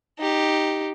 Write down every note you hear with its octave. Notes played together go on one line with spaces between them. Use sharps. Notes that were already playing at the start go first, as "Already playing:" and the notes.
D#4 G4